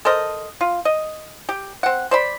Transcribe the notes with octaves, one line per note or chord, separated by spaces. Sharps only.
A4 A#4 C5 D#5
F4
D#5
G4
C4 F#5
C5 D5 B5